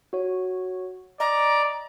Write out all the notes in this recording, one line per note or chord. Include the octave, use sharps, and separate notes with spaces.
F#4 C#5
D5 D#5 A#5